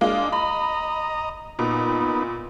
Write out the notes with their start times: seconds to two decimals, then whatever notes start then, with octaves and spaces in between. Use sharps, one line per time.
0.01 G#3 A#3 D4 F4
0.32 D#5 A#5 B5
1.59 A#2 B3 D#4